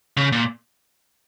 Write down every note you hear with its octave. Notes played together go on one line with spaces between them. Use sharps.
C#3
A#2